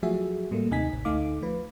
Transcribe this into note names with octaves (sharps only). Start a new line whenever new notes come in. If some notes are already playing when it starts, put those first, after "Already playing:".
F3 F#3 A3 F#4 G#4 E5
A2 G3 A3 A#3
D#2 C3 D#4 G#5 B6
A1
D2 A3 D#4 F5 D6
F3 B4